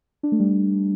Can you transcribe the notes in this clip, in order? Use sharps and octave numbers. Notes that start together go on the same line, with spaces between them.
D4
A3
G3